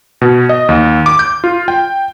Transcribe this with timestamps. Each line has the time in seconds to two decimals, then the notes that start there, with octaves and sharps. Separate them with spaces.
0.21 B2
0.49 D#5
0.69 D#2
1.06 D6
1.19 G6
1.44 F4
1.68 G5